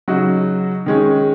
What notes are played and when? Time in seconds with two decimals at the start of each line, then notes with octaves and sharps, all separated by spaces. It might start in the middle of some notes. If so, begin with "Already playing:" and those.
0.08 C#3 F#3 D#4 F#4
0.86 D#3 G#3 C#4